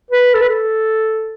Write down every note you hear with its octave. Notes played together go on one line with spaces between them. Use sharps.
B4
A4
B4
A4